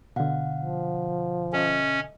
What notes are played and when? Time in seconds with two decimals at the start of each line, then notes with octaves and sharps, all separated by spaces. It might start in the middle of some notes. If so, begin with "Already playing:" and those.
0.16 B2 D3 F5 F#5
0.64 F3
1.53 C#4 A4 D#5 E5